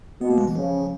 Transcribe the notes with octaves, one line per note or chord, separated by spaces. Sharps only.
B2 B3
A#3
G#3
E3
C#3 F3